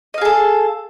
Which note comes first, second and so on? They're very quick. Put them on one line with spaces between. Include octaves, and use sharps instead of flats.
D#5 F5 G#4 A4